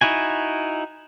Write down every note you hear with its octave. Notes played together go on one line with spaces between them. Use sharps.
D#4 E4 F#4 G#5